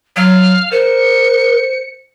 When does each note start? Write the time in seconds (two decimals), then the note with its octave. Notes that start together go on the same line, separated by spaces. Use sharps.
0.16 F#3 F5
0.72 A#4 C5 C#7